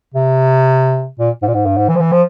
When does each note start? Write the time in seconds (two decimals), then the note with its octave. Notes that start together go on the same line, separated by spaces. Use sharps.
0.14 C3
1.19 A#2
1.42 G#2
1.48 A#2
1.54 G#2
1.65 G2
1.77 G#2
1.88 E3
1.95 F3
2.00 E3
2.12 F3